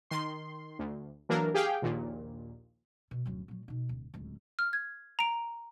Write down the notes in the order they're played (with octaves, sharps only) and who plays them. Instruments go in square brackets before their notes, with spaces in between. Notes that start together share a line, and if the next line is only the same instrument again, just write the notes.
[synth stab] D#3 C6
D2
E3 F#3 A#3 D4 A#4
G4 G#4 F5 G5
A#1 D#2 A#2
[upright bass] B2
D1 F#2
A#2 F#3
B2 D#4
D1
D1 C#2
[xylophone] F6
G#6
A#5 D7